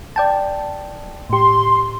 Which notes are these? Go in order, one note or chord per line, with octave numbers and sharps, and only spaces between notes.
D5 G5 A5
A2 G4 C6